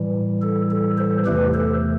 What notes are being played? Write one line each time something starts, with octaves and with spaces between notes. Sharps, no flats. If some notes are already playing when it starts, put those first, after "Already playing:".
Already playing: A2 E3 G3
A4
A4
A4 C5
E2 C3 E3 A3 G4 B4
A4 C5